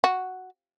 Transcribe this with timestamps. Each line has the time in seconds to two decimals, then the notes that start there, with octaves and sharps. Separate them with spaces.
0.04 F#4